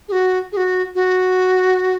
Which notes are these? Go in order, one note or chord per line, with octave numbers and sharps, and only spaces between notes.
G#4
F#4
G#4
F#4
F#4